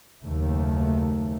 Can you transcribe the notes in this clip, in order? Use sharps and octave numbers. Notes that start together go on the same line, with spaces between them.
F#1 D#2 A3